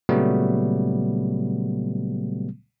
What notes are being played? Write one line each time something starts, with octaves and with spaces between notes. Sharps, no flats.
A#2 C#3 F#3 G3 A3 B3